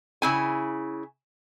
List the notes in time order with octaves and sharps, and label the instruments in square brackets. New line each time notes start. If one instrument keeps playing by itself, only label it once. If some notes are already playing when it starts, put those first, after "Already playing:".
[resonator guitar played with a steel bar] C#3 E4 G#5